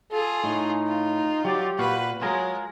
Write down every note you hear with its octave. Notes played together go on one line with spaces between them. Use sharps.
F4 G#4 A4
A2 D#4
F4
F#3 G4 D5
A#2 F#4 B4 F5
F#3 G#3 F4 G#4 A#4